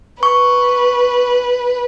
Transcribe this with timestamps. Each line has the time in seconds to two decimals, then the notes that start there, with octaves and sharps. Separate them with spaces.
0.23 B4 C#6